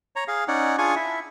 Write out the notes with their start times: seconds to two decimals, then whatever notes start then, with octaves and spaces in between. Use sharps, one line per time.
0.16 C#5 A#5
0.28 G#4 F5
0.48 C#4 D#4 D5 F#5
0.78 D4 F4 G#4 G#5 C#6
0.96 E4 E5